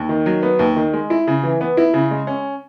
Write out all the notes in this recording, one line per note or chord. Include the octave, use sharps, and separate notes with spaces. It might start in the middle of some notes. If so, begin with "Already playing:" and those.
Already playing: D#2
D#3
F#3
B3
D#2
D#3
G#3
E4
C#3
E3
B3
E4
C#3
G#3
C#4